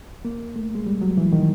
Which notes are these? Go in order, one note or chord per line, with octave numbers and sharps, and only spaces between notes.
A#3
A3
G#3
G3
F#3
E3
D#3